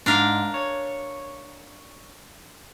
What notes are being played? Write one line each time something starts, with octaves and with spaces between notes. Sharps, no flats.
G#2 D4 A#4 F5
C#5